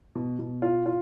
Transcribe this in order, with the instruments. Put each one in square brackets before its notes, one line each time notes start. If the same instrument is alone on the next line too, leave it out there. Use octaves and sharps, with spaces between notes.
[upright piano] B2
B2
F4
F4